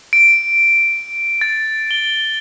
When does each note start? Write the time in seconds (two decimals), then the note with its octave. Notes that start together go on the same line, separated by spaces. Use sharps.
0.13 D7
1.41 A6
1.91 G7